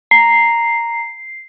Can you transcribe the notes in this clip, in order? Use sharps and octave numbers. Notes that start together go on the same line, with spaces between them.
A#5 C7